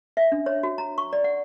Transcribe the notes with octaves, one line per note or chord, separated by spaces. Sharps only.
E5
D4
C#5
F#4
A#5
C#6
D5
F#5